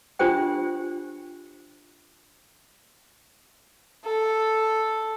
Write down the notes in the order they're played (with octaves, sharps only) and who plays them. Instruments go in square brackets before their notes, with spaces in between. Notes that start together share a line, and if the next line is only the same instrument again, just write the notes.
[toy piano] D4 F4 G4 C5 G5
[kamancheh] A4